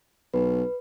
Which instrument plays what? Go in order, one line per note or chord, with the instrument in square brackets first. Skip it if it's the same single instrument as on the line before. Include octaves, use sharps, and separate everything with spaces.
[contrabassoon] B1 [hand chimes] B4